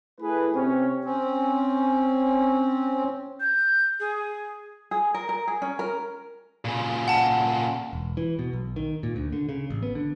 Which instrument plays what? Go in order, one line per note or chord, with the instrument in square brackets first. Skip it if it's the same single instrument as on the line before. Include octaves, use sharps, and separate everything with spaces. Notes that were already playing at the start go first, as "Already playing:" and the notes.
[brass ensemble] A3 E4 G#4 B4
C3 C4 C#4
[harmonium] C4 C#4
[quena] G6
G#4
[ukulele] G#4
A#4
A#4
G#4
C#4
A#4
[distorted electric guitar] A#2 C#3
[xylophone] F#5 A5
[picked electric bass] E1
E3
B2
B1
D#3
A#2
D2
D3
C#3
A1
B3
D3